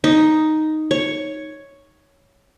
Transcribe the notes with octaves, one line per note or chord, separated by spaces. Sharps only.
D#4
C#5